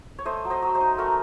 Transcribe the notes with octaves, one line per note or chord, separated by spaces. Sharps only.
C#5
A3 C5 D#5
F#3
C5 D#5
F#3
C5 D#5
D#4
A3 F#4 A#4